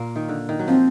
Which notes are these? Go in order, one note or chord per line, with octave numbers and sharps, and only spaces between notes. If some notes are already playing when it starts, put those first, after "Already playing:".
Already playing: A#2 A#3
D#3
D3
D#3
F#3
F3 C4